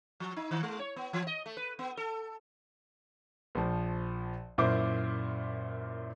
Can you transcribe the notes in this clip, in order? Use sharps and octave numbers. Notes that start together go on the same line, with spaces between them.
F3
D#4
D#3
G#3
C#5
B3
E3
D#5
A3
B4
B3
A4
A#1 F3
F#2 A#2 E4 C5 D6